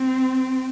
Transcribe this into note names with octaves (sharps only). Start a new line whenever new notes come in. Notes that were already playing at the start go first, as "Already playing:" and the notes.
Already playing: C4